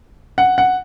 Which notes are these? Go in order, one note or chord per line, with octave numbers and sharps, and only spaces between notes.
F#5
F#5